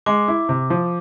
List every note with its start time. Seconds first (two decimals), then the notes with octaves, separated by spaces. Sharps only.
0.06 G#3 D6
0.28 E4
0.49 C3
0.70 F3